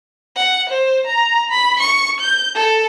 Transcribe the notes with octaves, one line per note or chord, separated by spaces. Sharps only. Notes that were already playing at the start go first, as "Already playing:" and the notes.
F#5
C5
A#5
B5
C#6
G6
A4